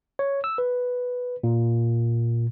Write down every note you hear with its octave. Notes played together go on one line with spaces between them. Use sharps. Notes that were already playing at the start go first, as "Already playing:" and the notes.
C#5
E6
B4
A#2